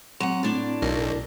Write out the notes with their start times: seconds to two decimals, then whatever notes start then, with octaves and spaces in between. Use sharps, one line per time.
0.20 F#3 C4 F#5
0.43 A2 D4 D5
0.82 B1 A#4